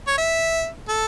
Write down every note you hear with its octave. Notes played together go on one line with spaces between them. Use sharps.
C#5
E5
A4